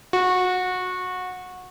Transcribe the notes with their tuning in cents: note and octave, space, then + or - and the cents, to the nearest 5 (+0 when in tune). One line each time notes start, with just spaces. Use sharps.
F#4 -20